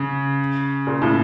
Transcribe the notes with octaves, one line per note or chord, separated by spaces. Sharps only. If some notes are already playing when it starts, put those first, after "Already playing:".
Already playing: C#3
A#2
A2